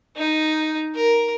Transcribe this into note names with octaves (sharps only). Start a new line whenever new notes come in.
D#4
A#4